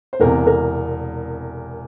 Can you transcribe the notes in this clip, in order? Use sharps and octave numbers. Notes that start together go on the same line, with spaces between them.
C5
E1 E2 C3 A#4
A#4